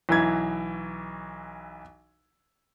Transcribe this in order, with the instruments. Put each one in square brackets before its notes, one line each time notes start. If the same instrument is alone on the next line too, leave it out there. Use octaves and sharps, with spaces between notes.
[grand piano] B1 E3 E4 G#6